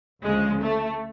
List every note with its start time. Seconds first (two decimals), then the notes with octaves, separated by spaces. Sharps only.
0.22 D2 C#3 F3 G#3
0.61 A3